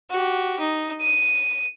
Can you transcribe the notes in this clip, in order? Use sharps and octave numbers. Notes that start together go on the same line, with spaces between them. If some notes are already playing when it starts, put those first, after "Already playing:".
F#4 G4
D#4
D#7